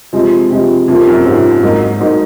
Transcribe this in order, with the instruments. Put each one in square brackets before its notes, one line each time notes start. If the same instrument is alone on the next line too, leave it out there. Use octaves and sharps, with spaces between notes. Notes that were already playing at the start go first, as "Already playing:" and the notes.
[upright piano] C3 F3 G#3
C3 F3 G#3
[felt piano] F2 [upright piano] C3 F3 A#3
[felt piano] F#2
[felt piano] G#2 [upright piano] C3 F3 A#3
[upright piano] G#2 F#3 A#3 D#4
[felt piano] G#2 [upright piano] F#3 A#3 D#4